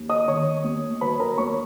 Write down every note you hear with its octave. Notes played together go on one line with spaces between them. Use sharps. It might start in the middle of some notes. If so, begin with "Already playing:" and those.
Already playing: D#2
D#5 D#6
D#3 C#5 C#6
D#2
F#3 B4 B5
A#4 A#5
D#2 C#5 C#6